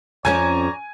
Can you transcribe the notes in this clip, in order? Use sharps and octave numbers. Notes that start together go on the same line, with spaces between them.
F2 F3 C#4 C#5 D5 G#5 A#5 G#6